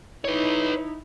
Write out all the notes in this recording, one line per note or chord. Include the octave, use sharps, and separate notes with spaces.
D#4 E4 B4 C#5